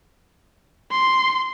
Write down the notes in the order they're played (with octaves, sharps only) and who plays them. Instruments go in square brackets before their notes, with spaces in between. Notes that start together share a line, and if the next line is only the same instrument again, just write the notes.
[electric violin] C6